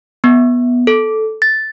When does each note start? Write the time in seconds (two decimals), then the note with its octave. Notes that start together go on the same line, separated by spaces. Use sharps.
0.24 B3
0.87 A4
1.42 A6